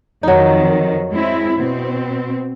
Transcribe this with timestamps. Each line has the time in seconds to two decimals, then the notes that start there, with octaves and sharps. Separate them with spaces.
0.23 F2 D#3 F#3 D#4
1.13 G#3 C4 E4
1.56 B2 C4